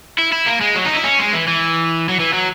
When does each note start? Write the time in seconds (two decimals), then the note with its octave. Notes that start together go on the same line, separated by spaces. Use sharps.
0.19 E4
0.33 E4
0.47 A#3
0.61 G#3
0.76 F#3
0.86 D#4
0.95 E4
1.04 C#4
1.19 G#3
1.33 E3
1.48 E3
2.09 F#3
2.20 E3
2.33 F#3